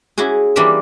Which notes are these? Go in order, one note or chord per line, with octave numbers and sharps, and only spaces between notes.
C#4 E4 F#4 G#4
E3 G3 A#3 D4 F4 E5